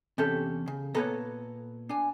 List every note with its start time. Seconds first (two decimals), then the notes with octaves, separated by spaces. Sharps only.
0.18 E2 C3 C#4 G4 A4
0.68 C#3
0.95 A#2 B3 A4 B4 C#5 A#5
1.89 D4 G#5